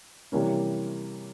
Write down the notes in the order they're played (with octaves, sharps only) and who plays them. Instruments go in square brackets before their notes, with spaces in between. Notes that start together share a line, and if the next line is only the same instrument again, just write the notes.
[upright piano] C3 E3 G3 A#3 C#4